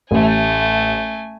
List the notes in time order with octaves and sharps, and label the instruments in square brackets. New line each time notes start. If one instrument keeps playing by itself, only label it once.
[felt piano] A1 [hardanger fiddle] A3 G#5